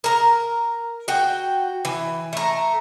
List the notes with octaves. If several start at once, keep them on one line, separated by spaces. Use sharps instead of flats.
A#4 A#5
F#4 G5
E3
A3 A#5